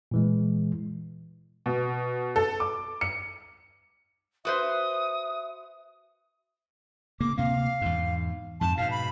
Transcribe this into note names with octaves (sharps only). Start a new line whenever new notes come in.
A#2 E3 G#3
B2
A4
D6
C#7
F#4 B4 C5 E5 D#6
C#3 A#3 D6
D2 C3 A#3 F5
E2 G#2
F2 G#2 A5
G#2 B2 F5
B5